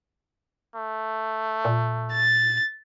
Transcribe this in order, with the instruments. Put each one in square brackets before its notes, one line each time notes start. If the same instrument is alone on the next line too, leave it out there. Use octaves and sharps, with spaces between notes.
[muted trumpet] A3
[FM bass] A#2
[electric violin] A6